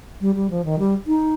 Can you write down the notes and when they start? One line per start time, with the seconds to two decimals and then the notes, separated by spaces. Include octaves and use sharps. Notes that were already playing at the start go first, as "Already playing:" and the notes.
0.21 G3
0.35 G3
0.50 F3
0.65 D#3
0.79 G3
1.07 D#4